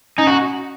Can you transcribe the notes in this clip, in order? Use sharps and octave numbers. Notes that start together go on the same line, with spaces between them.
C#4 D#4
F#4